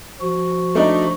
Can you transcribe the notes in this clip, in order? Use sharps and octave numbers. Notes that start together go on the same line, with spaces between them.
F3 F#4
A3 D4 D#4